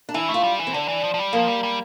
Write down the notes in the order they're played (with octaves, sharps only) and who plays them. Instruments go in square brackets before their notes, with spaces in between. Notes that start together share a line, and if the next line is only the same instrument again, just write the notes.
[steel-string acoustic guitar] D4
[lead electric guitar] E3 [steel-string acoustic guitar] E4
[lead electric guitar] A3
[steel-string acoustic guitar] F4
[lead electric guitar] G3
E3
[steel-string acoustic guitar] C4
[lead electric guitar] D3 [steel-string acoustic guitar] D4
[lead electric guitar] E3
F3
F3
G3
[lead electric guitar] F3 [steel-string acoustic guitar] A#3
[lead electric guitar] G3
G3